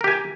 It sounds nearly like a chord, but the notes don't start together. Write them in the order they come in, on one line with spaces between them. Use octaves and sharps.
A#4 G4 G#5